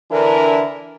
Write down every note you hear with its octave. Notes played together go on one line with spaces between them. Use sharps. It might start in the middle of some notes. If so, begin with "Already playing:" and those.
D3 E3 D4 E4 A#4